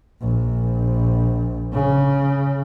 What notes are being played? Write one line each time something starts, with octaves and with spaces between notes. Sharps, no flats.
A#1
C#3